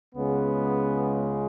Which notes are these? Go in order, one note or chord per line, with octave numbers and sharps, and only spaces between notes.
C#2 C#3 G#3 B3